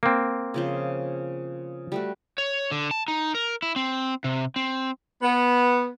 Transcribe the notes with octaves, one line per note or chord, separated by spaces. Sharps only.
A#3 C4
C#3 F3 C5
G3 A3 F#4
C#5
D3
A5
D#4
A#4
E4
C4
C3
C4
B3